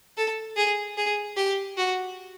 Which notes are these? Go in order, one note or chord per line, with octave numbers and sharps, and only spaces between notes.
A4
G#4
G#4
G4
F#4